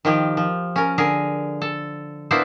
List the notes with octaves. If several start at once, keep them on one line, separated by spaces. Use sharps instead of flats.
D#3 F3 G4
F3
C#4 A#4
D3 G#4 A#4
A4
A#3 B3 D4 E4 B4 C5